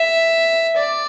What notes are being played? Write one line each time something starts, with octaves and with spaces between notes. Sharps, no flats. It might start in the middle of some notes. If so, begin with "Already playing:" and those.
Already playing: E5
D5